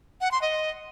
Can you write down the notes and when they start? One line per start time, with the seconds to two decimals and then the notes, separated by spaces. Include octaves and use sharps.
0.21 F#5
0.31 C6
0.42 D#5